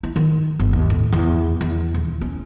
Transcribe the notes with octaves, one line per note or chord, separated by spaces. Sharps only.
E4
D#3
G1
D#2
A2
E2
E2
D#1
C#4